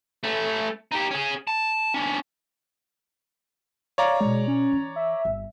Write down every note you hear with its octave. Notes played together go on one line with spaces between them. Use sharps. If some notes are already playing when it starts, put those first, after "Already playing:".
A3 C#4
D#4 G4
C#4 G#4
A5
C#4 D4
C#5 D5 F5 A#5
B2 G#3 E4
C#4
E3
E5
G1